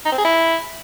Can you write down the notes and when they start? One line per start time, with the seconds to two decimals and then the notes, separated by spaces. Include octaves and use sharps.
0.05 D#4
0.12 C4
0.18 G#4
0.25 E4